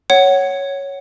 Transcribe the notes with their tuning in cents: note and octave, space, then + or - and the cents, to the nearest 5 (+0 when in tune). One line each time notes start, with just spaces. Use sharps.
C#5 +0 F#5 +15